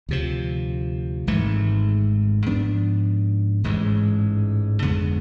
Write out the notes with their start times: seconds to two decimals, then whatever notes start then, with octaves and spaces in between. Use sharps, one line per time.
0.09 D2 C3 F3
1.27 G#1 G#2 E3 A3
2.46 G#2 F3 B3 D4
3.64 A1 G#2 E3 G#3
4.82 F2 D3 G#3 B3